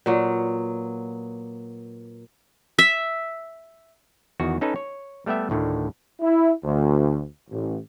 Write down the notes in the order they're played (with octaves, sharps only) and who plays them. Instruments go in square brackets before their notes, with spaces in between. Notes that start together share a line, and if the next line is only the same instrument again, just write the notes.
[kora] A#2 F#3 B3
[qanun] E5
[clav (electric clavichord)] E2 D#3 F#4
C#4 D#4 A4 B4
C#5
G3 A3 B3 G4 E5
D2 A2 D3 D#3
[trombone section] E4
D2
A1